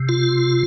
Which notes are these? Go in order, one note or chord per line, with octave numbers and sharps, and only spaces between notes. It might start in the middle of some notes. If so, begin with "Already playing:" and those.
Already playing: C3
F4